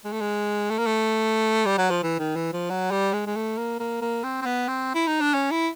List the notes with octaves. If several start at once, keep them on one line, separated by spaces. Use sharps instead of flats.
G#3
A3
G#3
A3
A#3
A3
G3
F#3
F3
E3
D#3
E3
F3
F#3
G3
G#3
G#3
A3
A#3
A#3
A#3
C4
C4
B3
C4
E4
D#4
D4
C#4
E4